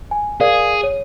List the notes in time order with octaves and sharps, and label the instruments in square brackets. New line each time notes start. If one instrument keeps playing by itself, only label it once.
[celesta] G#5
[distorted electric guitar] G#4 [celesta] A#4 D5 F5
[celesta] C#5